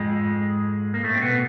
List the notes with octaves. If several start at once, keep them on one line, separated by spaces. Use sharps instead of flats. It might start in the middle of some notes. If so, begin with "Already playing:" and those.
Already playing: F2 G#2 G#3
A#3
A2 A3
C4
B2 B3